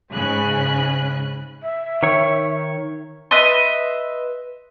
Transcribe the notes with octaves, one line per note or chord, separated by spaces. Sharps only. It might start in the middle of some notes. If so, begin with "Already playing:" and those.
G#2 C#3 G#5 B5 F#6
E5
D#3 C#5
B4 D#5 E5 C6